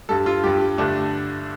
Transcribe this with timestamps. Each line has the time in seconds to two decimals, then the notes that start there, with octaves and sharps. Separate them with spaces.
0.09 G2 G3 A4
0.26 F4
0.44 G2 G3 G4
0.78 G2 D3 A3 D4